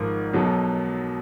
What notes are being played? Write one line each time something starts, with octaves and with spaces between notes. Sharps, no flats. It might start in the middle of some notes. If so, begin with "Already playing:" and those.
Already playing: G#1 G#2 F3 A#4
B1 B2 F#3